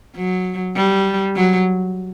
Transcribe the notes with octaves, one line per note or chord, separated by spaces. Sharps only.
F#3
G3
F#3